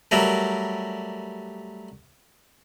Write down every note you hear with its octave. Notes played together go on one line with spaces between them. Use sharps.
F#3 G3 A3 A#4